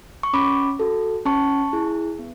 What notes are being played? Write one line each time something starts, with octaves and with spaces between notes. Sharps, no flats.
C#6
C#4 B5 D6
F#4 A4
C#4 A5 C#6
E4 G#4
B3